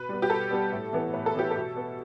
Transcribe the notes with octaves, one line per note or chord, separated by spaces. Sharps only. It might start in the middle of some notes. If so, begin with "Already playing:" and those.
Already playing: B2 B4
G3 B3
G4
B2 A4
G3 B3
A2
E3 B3
A2 B4
A4
E3 B3 G4
A4
B2
B3